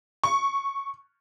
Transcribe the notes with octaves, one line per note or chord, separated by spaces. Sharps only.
C#6